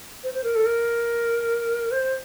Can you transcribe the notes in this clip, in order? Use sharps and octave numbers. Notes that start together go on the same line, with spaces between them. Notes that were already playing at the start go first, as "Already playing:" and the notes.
C5
C5
A#4
A4
A#4
C5